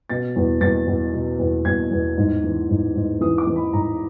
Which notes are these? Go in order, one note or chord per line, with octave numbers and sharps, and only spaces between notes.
B2 A6
E2
E2 A6
E2
B2
E2
E2 G#6
E2
G#2
E3
G#2
G#2
E3 D#6
D6
E3
B5
G#2 A#5